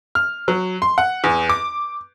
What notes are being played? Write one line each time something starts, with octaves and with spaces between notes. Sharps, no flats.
F6
F#3
C6
F#5
E2
D6